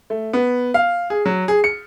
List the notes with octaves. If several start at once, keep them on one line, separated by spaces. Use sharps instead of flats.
A3
B3
F5
G#4
F#3
G#4
C#7